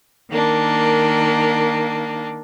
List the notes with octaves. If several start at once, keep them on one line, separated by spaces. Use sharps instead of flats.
D#3 A#3 D4